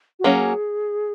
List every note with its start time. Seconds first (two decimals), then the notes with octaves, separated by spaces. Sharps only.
0.19 F#4
0.24 F#3 A#3 C#4 G#4